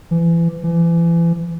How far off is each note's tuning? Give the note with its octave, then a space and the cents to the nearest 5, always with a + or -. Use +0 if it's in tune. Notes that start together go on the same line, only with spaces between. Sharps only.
E3 +30
E3 +35